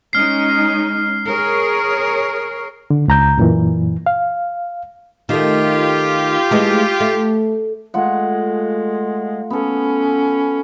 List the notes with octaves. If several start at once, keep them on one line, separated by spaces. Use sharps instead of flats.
G#3 C#4 D#4 F6 C7
G#4 A#4 C#5
D3
C#2 A#5 G6
F#2 A#2 E3
F5
D#3 A3 F4 G4
E3 G#3 A3
A3
G#3 A3 F4 F#5
B3 C#4 A4